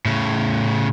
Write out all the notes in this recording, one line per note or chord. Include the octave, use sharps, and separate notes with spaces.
A2 C#3